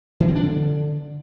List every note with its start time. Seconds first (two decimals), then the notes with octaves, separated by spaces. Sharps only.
0.20 E3
0.28 C4
0.35 D4
0.43 D3